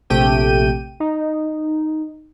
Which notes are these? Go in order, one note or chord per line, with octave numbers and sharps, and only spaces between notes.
A#1 C3 A3 G4 G5 D#7
D#4